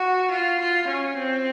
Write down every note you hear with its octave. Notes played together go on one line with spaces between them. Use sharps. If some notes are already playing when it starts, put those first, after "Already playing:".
Already playing: F#4
F4
F4
C#4
C4